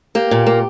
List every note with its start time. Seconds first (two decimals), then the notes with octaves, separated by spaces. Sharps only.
0.15 A#3 G4
0.31 A#2
0.47 A#3